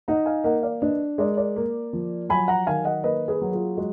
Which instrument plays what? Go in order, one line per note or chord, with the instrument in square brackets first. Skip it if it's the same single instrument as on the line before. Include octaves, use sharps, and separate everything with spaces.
[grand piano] D#4 [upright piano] F#5 A#5
[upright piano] F5 G#5
[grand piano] A#3 [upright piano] D#5 F#5
[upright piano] D5 F5
[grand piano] D4 [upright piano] B4 D#5
[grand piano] G#3 [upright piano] A#4 D5
[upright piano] A#4 D5
[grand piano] A#3
F3
[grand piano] F#3 [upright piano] G#5 B5
[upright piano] F#5 A#5
[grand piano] D#3 [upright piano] F5 G#5
[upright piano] D#5 F#5
[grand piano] A#3 [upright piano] B4 D#5
[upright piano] G#4 B4
[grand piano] F#3
[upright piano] F4 G#4
[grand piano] G#3 [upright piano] F#4